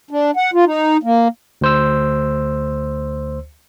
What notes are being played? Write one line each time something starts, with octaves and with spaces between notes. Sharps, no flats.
D4
F#5
F4
D#4
A#3
D2 C5 E6